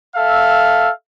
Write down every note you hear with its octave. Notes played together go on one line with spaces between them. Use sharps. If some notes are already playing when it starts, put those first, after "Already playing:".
A4 E5 F5